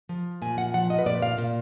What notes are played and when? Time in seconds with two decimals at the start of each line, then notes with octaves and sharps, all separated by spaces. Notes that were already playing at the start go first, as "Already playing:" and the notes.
0.09 F3
0.42 A#2 G#5
0.58 F#5
0.74 F3 F#5
0.90 D#5
0.99 B4
1.06 A#2 D5
1.22 F5
1.38 A#2